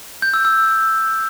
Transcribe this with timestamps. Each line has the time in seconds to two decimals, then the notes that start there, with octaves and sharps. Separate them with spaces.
0.22 G6
0.34 E6
0.45 E6